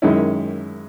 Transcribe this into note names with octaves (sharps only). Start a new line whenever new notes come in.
F#2 D#3 G#3 C#4 E4